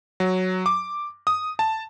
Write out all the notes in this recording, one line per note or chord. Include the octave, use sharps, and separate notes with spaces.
F#3
D6
D#6
A5